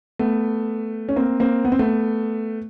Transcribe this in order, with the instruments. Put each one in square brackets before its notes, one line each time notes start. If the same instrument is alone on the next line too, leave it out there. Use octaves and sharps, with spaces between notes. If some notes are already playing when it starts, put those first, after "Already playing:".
[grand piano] A3 B3
C#4
A#3 C4
A#3 C4
B3
C4
A3 B3